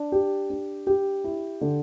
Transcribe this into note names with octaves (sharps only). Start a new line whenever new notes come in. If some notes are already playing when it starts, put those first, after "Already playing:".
Already playing: D4
G4
D4
G4
E4
D3